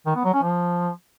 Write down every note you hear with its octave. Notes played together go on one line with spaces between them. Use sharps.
D#3
B3
F#3
C#4
F3